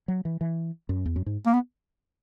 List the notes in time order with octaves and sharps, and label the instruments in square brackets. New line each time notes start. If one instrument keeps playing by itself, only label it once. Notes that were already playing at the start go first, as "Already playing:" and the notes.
[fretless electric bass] F#3
E3
E3
F#2
E2
F#2
G#2
[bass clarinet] A#3
B3